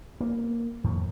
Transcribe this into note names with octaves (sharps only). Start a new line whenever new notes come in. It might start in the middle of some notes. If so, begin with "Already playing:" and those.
A#3
F2 A2 D#3